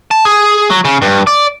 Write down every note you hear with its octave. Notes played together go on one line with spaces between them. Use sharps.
A5
G#4
F#3
C#3
G2
D5